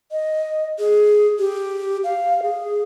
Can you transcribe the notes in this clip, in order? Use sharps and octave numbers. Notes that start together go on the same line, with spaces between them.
D#5
G#4
G4
F5
G#4